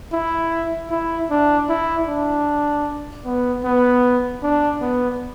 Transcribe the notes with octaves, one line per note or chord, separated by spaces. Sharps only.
E4
E4
D4
E4
D4
B3
B3
D4
B3